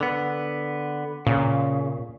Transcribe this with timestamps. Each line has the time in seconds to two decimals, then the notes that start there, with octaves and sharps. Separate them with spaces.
0.01 D3 B3
1.27 A#2 C#3